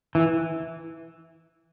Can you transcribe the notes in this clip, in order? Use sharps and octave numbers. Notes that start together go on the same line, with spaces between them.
E3